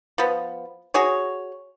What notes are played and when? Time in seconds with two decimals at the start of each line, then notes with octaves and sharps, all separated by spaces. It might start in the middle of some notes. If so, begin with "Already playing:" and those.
0.18 F3 B3
0.94 F#4 G#4 C#5